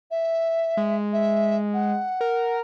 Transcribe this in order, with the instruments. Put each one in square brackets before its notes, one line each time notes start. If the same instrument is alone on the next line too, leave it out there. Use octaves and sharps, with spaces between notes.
[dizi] E5
[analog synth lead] G#3
[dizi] E5
F#5
[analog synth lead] A#4